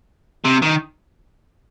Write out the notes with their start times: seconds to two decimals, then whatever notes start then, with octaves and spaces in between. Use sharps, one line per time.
0.44 C3
0.62 D#3